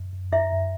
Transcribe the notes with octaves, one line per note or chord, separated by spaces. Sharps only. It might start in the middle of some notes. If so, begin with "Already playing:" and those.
Already playing: F#2
F#2
F#2 E4 E5
F#2